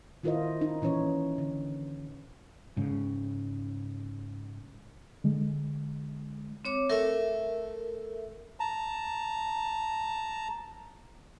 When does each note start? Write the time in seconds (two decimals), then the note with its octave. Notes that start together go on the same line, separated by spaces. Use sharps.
0.23 D#3 E4 F4 A#4 C5 D#5
0.61 D#4
0.82 A#2 E3 C#4 C#5
1.38 D3
2.77 G#2 C#3
5.24 D3 G#3
6.65 C4 C#5 D6
6.90 A3 A#4 E5
8.60 A5 A#5